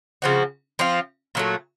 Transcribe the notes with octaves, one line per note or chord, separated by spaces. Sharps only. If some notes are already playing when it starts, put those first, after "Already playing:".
C#3 F3 C4 F#4
F3 C4 F4
A#2 F#3 A3